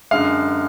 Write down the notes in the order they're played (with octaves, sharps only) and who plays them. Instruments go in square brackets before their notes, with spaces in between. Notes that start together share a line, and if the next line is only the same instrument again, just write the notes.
[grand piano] F#2 D3 G#3 F5